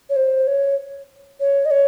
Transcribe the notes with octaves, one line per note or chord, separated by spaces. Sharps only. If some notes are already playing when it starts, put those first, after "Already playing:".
C#5
C5
C#5
C#5
D#5
C#5